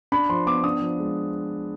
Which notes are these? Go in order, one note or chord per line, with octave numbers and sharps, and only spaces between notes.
D4 B5
F3 C6
B3 D6
D4 D#6
F3
G#3